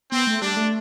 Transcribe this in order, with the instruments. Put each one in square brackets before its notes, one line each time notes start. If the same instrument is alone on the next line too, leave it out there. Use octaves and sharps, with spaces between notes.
[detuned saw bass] B3 [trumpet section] C4
[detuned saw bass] A3
[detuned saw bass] G3 [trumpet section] D4
[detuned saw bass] A3